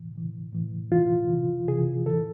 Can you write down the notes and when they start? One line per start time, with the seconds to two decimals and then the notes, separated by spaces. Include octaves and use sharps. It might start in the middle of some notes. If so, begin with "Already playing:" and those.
Already playing: A2 E3
0.15 A2 E3
0.52 A2 E3
0.92 A2 E3 F4
1.29 C3 E3
1.68 C3 E3 G#4
2.06 A2 E3 A4